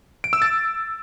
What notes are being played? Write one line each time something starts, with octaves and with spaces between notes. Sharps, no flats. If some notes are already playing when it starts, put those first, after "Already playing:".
D7
E6
A6